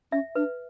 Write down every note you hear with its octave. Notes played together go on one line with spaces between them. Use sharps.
C#4 E5
D4 B4